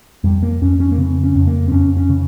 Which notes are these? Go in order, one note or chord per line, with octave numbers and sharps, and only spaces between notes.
F2 G3
A#3
F2 C#4
C#4
A#3
C#3 C4
C#4
F2
A#3
C4
F2 C#4
C#4
C#3